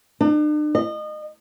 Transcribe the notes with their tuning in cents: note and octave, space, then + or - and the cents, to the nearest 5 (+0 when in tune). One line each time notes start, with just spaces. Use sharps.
D4 +45
D#5 -30